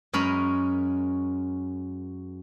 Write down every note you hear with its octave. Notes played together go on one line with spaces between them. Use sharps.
F#2 G#3 C#4 A#4 B5